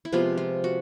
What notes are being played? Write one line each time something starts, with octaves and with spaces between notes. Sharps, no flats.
E4
C3 F3 G#3 B3 F4
F4
F#4